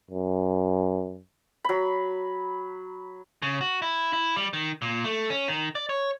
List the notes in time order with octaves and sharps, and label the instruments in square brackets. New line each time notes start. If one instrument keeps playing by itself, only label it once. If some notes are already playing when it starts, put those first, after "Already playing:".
[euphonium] F#2
[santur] F#3 B5
[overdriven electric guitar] C#3
F#4
E4
E4
G3
D#3
A#2
A3
C#4
D#3
D5
C#5